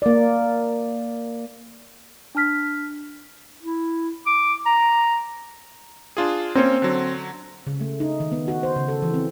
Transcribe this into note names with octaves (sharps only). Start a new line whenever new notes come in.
A#3 D5
D4 A5 F6 B6
E4
D6
A#5
D4 F4 G#4
A#3 C4 C#4 C#5
D3 F#3
C#3
A3
D#4
D#3
B3
F#4
C5
C#3
A4
E3
C4